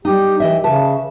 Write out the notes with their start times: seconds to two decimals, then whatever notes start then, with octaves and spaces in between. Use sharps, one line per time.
0.05 G3 D#4 G4
0.40 E3 D#5 E5
0.64 C#3 B4 E5 A5